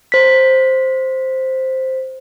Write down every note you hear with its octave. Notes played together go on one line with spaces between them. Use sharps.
C5 B6